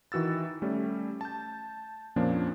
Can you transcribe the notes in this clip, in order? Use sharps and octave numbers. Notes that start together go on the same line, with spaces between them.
D#3 E3 F#4 E6 A6
G3 A3 C#4
A5 G6
F2 A#2 F3 A#3 C#4 D4